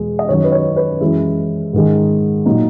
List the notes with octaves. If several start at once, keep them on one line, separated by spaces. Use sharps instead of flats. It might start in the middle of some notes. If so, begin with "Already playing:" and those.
Already playing: E2 B2 G#3
D#5
F#2 D#3 F#3 C#5
B4
C#5
B4
F#2 E3 G#3 E4
G#2 D#3 G#3
A#2 F#3 D#4